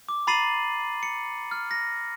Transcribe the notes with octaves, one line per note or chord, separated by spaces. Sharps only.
D6
A#5 B5 A6 C7 D#7 F#7
C#7
F6
A#6